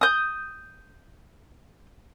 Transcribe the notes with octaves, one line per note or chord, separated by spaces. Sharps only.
D#6 G6